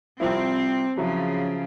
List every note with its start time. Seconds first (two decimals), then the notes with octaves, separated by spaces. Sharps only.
0.20 C2 F3 C4 E4
0.98 C#3 F3 F#3 E4